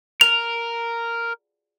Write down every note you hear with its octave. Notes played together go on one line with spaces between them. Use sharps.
A#4 F7